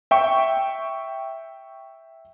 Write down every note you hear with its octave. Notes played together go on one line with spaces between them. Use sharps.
E5 G5 C#6